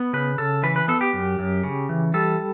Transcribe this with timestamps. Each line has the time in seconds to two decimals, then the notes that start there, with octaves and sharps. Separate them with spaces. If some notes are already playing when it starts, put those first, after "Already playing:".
Already playing: B3
0.13 C#3 B4
0.38 C#3 A4
0.63 E3 B4
0.76 B4
0.88 B3 A4
1.01 G4
1.13 F#2
1.39 F#2
1.63 C#3
1.89 E3
2.14 G3 A4